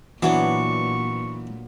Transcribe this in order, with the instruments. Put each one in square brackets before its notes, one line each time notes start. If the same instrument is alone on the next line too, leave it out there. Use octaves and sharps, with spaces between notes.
[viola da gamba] A#2 [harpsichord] E3 [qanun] F#3 B3 D4 [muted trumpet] C#6